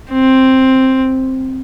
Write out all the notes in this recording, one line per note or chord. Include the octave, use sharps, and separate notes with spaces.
C4